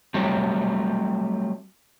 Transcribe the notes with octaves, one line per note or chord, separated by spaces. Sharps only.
F#3 G3 A3 C4